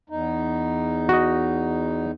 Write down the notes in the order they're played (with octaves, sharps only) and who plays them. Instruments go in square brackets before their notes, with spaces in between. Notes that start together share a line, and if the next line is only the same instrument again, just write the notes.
[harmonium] E2 D#4
[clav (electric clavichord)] F#4 D#5